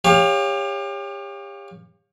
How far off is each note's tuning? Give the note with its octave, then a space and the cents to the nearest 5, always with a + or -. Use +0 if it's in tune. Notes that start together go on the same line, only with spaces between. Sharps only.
G4 +35 C#5 +0 F5 +20